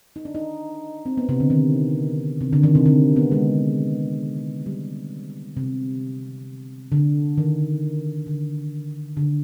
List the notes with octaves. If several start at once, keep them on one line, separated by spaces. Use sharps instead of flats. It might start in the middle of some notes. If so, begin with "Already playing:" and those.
D#4
D4
D#4
C4
B3
C3
D3
D#3
C3
D3
D#3
C3
D3
B3
G#3
G3
C3
D3
D#3
D3
D3